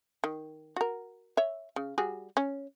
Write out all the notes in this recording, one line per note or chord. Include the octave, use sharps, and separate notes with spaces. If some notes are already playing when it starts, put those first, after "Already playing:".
D#3
F#4 A#4
C#5 E5
C#3
G3 F#4 G#4
C#4